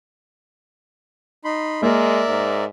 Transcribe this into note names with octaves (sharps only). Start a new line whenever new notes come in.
D#4 B5 C6
G#3 A#3 A#4 D5 E5
G#2